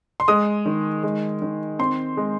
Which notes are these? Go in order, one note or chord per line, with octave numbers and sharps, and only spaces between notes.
C6
G#3 D#6
D#3
G#3
D#3
C4 C6
G#3